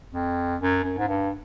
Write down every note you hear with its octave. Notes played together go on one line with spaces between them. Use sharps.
F2
F#2
F#2
G#2
G2